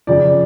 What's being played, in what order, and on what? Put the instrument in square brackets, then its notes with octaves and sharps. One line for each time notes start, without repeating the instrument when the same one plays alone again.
[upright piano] F2 C#3 F3 D5